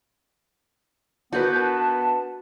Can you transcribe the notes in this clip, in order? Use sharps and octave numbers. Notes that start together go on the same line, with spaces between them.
B3 D4 F#4 A#4 B4 F#5 G6
A5